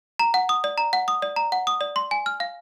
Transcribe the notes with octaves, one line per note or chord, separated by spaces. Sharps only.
A#5
F#5
D#6
D5
A#5
F#5
D#6
D5
A#5
F#5
D#6
D5
C6
G#5
F6
F5